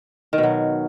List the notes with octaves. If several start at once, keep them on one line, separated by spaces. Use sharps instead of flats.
D#3
B2
F#3